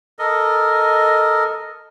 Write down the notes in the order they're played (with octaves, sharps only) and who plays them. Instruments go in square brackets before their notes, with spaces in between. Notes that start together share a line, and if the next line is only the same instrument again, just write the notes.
[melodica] A4 A#4 D#5